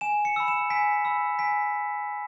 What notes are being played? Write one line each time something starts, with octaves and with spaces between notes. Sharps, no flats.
G#5 E7
C#7
B5 E6
E7
G#5 B6
B5 E6
G#5 B6